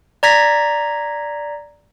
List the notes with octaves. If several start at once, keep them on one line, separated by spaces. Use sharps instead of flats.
D5 A#5 G#6 A#6 B6